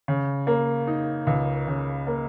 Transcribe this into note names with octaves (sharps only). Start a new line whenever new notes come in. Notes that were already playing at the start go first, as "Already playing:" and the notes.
C#3
A#3
D#4
C#2
C#3
A#3